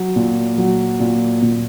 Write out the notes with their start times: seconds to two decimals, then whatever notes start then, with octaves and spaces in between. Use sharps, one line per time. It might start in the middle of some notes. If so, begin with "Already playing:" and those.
Already playing: F#3
0.16 A#2
0.58 F#3
1.00 A#2
1.42 A#2